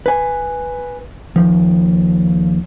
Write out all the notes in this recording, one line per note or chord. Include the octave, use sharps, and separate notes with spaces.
B4 G#5
D#2 F3